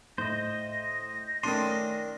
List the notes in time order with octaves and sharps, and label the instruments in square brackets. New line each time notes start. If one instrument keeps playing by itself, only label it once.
[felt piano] A2 [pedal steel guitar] C5 D#5 [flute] A#6
[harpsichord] D#3 D4 [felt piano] A3 C#4 D#7 [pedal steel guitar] C6